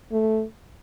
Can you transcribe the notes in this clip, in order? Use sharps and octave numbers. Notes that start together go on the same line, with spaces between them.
A3